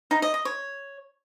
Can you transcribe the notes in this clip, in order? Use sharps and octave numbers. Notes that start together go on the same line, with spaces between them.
D#4
D#5
D#5
C#5